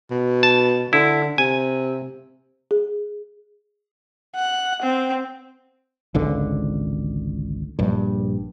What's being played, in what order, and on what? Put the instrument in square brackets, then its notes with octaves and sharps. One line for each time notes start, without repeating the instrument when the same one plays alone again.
[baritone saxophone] B2
[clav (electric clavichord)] A5
[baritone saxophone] D3 [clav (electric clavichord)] E4
[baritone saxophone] C3 [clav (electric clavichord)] G#5
[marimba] G#4
[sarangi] F#5
C4
[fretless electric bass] G#1 C#2 D3
A#1 G2